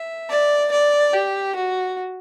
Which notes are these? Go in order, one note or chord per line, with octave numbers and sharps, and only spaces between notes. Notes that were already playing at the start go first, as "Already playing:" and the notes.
Already playing: E5
D5
D5
G4
F#4